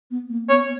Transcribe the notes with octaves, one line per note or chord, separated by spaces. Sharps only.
B3
A#3
B3 C#5